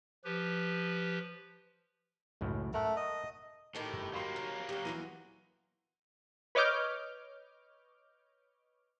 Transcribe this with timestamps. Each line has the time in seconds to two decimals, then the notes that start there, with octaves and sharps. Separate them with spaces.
0.24 F3 G4 B4
2.41 C#2 F#2 A2
2.74 A3 A#4 F#5
2.96 D#5
3.75 D2 A2 D#3 G4
3.93 G1
4.13 F#3 A#3 F5 B5 C6
4.36 C#3
4.69 C#3 F#4 G4
4.85 E3 B3 F4 F#4 D#7
6.55 B4 C#5 D#5 D6 F6 G6